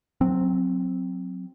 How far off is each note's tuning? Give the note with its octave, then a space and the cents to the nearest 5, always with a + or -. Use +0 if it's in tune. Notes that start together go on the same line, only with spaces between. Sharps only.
F#3 -10 C4 +0